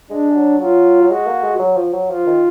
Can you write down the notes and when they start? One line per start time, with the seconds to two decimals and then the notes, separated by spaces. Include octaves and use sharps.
0.10 G#3 D4
0.31 G#3
0.35 F#3
0.60 F#3 F4
1.01 F#3
1.09 G#3 F#4
1.27 A#3
1.44 G#3
1.59 F#3
1.76 F3
1.93 F#3
2.09 F3 F4
2.27 D#3